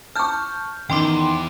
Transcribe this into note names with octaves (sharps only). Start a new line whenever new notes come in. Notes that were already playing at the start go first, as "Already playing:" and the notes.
A5 C#6 F6 G6
E2 D#3 G5 C6 D6